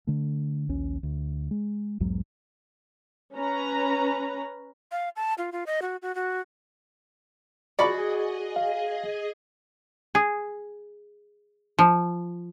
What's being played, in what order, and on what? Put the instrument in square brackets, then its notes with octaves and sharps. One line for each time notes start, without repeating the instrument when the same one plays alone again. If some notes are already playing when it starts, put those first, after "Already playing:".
[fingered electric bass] D3 A3
A#1 D#2 C#4
D2
G#3
B1 E2 G#2 F#3
[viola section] C#4 B4 A#5
[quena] F5
A5
F4
F4
D#5
F#4
F#4
F#4
[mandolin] F#4 [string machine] G#4 D#5 [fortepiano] D5 B5 C#6
[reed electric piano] F5
[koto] G#4
F3